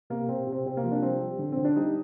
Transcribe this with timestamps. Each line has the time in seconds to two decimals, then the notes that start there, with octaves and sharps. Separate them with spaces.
0.10 C3 A#3
0.28 C3 C4
0.47 C3
0.53 C4
0.66 C3 C4
0.77 A#3
0.84 F3
0.92 D4
1.02 G3 C4
1.21 G3
1.39 D3
1.52 D3 C4
1.64 D4
1.76 G3 D#4